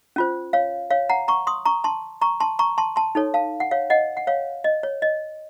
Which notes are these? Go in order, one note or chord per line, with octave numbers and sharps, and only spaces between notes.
C#4 F4 C5
C#5 F5
C#5 F5
F#5 A#5
A#5 C#6
C6 D#6
A#5 C#6
A5 C6
A#5 C#6
A5 C6
A#5 C#6
A5 C6
A5 C6
D#4 A4 C#5
F5 A5
F#5
C#5 F5
D#5 F#5
F#5
C#5 F5
D#5
C#5
D#5